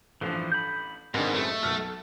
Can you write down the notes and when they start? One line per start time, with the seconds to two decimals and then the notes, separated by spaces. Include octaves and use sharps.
0.21 A1 G2 E3 F3
0.52 B5 G6
1.14 G#2 D#3 G#3 C4 D4 A#4 B4
1.35 F#2 A2 G#3 A3
1.48 D#5
1.63 B1 A4 F6 F#6